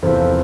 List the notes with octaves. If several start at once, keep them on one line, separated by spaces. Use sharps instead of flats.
E2 C3 F3 A4 C5